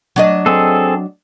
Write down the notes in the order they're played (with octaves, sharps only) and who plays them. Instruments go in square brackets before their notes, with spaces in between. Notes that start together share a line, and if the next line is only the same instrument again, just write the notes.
[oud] F#3 D4 D#5
[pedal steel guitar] C4 G#4 A4